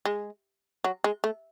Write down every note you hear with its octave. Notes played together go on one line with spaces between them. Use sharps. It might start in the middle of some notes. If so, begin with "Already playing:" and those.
G#3
F#3
G#3
A3